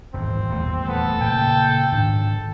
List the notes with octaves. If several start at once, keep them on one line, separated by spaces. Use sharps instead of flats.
D#1 G#1 E3 C4
D#1 E2 A3
B3 A4
A#2 C#3 G5
G#2 D#3 D4